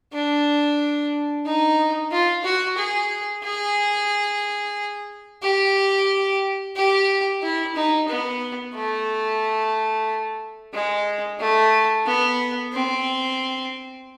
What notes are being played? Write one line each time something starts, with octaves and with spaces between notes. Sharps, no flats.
D4
D#4
F4
F#4
G#4
G#4
G4
G4
E4
D#4
B3
A3
G#3
A3
B3
C4